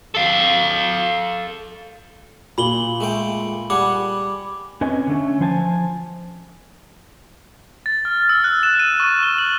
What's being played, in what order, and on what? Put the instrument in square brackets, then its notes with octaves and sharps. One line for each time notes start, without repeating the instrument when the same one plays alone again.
[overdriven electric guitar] A4 F5
[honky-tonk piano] A#2 [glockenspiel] B5 F#7 G7
[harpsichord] G#3 A3 G5
[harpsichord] G3 G#4 F#5 [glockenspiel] D6
[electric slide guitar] C4 C#4 B4 D#5 G#5
D3 A3 C#4
F3 C5 G#5 A5
[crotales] A6
F6
E6
F#6
E7
D#7
C#6
G7
F#7